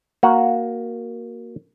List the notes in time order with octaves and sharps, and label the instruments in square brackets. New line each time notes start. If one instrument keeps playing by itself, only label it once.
[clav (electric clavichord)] A#3 F#4 F#5